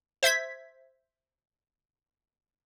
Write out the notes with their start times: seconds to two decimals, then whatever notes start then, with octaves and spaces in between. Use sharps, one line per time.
0.23 C5 E5 G#6 B6